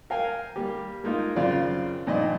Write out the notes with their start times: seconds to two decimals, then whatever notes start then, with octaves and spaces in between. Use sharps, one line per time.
0.10 A#4 F5 G5 G#5
0.56 G3 A#3 G4
1.04 G#3 A#3 D#4 F4 A#4
1.36 F#2 C#3 C4 F4 D5
2.07 G2 A#2 D#3 F3 D5 D#5